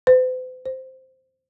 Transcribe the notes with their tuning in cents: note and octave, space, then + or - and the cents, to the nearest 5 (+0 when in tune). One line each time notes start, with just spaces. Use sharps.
C5 -45
C5 -5